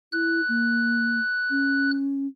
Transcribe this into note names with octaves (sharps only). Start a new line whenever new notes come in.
E4 F#6
A#3
C#4